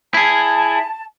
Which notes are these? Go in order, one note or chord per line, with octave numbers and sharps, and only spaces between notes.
E4 G#4 A5